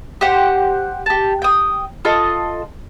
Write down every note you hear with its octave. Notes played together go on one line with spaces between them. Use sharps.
G4 C5 F#5
G4 A5
G5 D#6
F4 A4 D#5